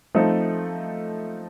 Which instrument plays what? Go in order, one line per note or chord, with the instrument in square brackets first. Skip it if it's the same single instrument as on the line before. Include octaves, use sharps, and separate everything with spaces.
[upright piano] F3 A3 C4 D#4 A4